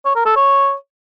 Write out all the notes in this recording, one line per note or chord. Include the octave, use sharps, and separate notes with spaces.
C#5
A#4
A4
C#5